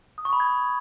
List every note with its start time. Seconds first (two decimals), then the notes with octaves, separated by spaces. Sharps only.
0.18 D#6
0.25 C#6
0.33 B5
0.40 G#6